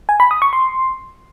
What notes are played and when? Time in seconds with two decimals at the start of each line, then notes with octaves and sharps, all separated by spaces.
0.09 G#5
0.20 B5
0.31 D#6
0.42 C#6
0.53 C6